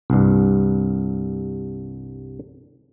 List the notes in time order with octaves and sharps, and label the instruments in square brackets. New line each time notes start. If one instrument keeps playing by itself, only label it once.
[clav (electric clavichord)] C2 G2